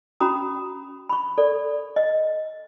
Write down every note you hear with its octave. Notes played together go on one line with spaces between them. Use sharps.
C#4 F#4 A#5 B5 D#6
B5 C#6
A4 D5
D#5